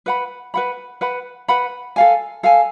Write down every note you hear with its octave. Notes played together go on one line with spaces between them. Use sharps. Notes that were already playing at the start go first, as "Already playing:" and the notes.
B4 F#5 B5
B4 F#5 B5
B4 F#5 B5
B4 F#5 B5
A4 F5 G#5
A4 F5 G#5